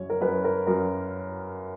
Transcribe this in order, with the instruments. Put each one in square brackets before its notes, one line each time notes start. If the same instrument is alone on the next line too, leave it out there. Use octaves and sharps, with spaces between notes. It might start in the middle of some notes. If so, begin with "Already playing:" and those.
Already playing: [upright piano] F#2 C#5
A#4
F#2 B4
A#4
F#2 A#4